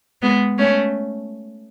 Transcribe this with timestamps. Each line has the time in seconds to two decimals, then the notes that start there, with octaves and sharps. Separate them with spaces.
0.22 G#3 B3
0.58 A3 C#4